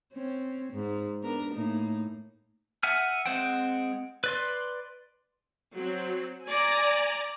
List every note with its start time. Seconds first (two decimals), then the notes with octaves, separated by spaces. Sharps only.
0.13 C4 C#4
0.73 G#2
1.22 B3 D4 A#4
1.54 A2 A#3 D#4
2.83 E5 F#5 G#5 F6
3.26 G#3 C4 C5 F#5 G5
4.24 B4 D5 C6
5.76 F#3 C4
6.47 D5 G#5 A#5